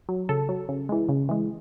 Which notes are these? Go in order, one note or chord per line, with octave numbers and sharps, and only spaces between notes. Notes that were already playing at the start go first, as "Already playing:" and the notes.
F#3
C#3 A4
F#3
C#3
E3 G#3
C#3
E3 G#3